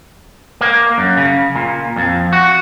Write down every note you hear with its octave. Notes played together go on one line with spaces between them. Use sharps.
A#3
F#2
C#3
A#2
F2
F#4